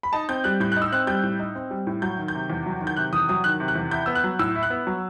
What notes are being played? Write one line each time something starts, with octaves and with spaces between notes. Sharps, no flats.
B5
D#4 A5
C4 G6
G3 F#6
A2 G6
D#4 F#6
E6
C4 F#6
G3 G6
A2
D#4
C4
G3
A2
F#3 G6
D#3
G6
C3
E2
F#3
D#3
G6
C3 F#6
E2 D#6
F#3 D#6
D#3 F#6
C3
F#6
E2
E4 G6
B3 E6
F#6
F#3
A2 E6
E4
F#6
B3
F#3